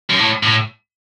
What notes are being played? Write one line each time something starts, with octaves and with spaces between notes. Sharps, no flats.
F#2
A2
A2